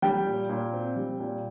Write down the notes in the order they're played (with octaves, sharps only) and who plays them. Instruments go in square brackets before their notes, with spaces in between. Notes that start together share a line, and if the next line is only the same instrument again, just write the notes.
[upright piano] G3 G5
A#2
A#2
C4
G3
A#2